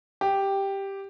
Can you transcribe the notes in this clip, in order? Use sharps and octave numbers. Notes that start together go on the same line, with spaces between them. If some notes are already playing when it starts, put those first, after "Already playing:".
G4